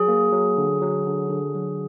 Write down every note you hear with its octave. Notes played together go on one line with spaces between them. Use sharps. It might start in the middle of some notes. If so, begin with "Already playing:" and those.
Already playing: F#3 G#4
A#3
F#3
D3
F#3
D3
D3
F#3